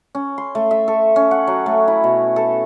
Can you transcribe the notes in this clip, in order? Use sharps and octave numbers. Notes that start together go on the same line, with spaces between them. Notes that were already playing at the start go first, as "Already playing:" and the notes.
C#4
C6
A3
E5
A4
C#4
F#5
F#3
A3
E4
B2
A4